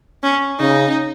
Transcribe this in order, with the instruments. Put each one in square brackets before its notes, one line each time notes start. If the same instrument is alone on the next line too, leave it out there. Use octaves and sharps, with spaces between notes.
[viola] C#4
[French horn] C#3 [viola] D#4